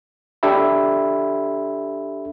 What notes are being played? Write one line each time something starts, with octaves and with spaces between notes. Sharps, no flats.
D4 G4 A4 E5 B5